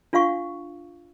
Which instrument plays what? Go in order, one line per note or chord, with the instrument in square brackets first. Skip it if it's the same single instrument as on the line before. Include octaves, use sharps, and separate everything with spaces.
[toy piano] D4 F4 F5 F#5 C#6